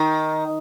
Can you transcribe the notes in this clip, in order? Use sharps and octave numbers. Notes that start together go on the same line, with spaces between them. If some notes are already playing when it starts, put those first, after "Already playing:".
Already playing: D#3